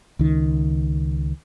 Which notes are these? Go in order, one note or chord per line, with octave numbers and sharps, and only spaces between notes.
C#2 D#3